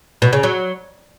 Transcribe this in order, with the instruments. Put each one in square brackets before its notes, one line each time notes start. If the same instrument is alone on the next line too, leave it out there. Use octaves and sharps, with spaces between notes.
[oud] B2
C#3
F#3